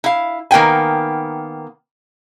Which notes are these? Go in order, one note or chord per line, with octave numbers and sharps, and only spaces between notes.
E4 F5
D#3 A#3 B3 G5 G#5